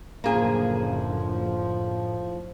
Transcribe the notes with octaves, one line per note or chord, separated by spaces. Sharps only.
F#1 A2 D3 F3 A#3 G#4